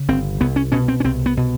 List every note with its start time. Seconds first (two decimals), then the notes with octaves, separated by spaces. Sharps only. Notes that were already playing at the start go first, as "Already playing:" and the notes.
Already playing: C#3
0.08 G1 C4
0.41 C2 B3
0.56 C#4
0.72 B2 C#4
0.88 C4
1.00 C#4
1.05 C2 C4
1.26 B3
1.37 B2